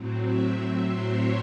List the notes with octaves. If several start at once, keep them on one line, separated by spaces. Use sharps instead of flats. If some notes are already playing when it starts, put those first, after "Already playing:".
Already playing: A2 F#3 C4
E5
C5
C#5